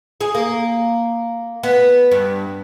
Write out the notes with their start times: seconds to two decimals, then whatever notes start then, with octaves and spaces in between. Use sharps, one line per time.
0.21 G#4
0.35 A#3
1.63 B3
2.11 G2